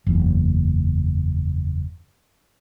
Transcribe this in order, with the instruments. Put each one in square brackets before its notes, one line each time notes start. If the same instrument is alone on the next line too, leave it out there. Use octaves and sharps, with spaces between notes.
[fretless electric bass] F#1 E2